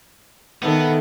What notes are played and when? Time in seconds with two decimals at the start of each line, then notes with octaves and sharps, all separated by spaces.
0.63 D#3 B3 A4 E5